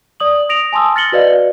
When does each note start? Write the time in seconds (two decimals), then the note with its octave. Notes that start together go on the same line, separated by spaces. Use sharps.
0.20 D5 D#6 F#7
0.49 D#6 A#6 D7 F7
0.73 G#5 A5 C6 D#6 E6
0.95 F6 A6 A#6 C#7 F#7 G7
1.12 F#4 B4 D5 D#5 F5